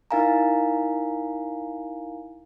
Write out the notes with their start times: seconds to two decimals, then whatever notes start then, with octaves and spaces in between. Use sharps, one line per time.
0.11 D#4 E4 A#4 F5 G#5 A#5